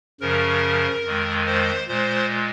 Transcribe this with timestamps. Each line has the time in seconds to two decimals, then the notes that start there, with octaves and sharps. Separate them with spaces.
0.20 F#2 C#3 F3 A#4
1.04 F2 D#3 G#3
1.46 C5
1.88 A#2 G#3 C5